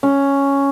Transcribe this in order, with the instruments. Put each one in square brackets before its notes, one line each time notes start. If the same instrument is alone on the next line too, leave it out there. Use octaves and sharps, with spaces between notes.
[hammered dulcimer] C#4